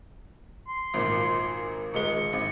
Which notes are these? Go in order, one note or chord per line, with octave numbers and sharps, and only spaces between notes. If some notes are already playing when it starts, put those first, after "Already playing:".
C6
G#1 A#2
D#1 G#3 C#6 G7
G#1